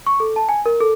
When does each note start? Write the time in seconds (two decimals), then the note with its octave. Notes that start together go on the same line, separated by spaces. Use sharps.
0.07 C#6
0.20 A4
0.36 A5
0.49 G#5
0.66 A#4
0.81 A4